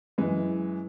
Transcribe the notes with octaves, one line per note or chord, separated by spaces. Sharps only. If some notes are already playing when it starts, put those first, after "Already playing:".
F#2 E3 G#3